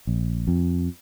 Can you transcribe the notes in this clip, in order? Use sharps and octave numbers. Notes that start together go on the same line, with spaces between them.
A#1
F2